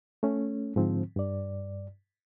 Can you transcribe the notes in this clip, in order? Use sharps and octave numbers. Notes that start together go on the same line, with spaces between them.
A3 C#4
G#2 D3 F3 C4
G2 D5